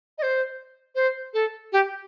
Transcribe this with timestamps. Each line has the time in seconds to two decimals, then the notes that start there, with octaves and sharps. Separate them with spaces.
0.18 D#5
0.23 C5
0.95 C5
1.34 A4
1.73 G4